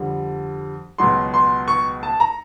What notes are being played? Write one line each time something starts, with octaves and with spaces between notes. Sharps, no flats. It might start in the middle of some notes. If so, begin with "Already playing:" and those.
Already playing: F2 D3 G3
C#2 B2 F#3 C6
C6
C#6
A5
A#5